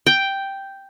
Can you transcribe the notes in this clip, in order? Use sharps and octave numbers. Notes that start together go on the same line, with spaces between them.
G5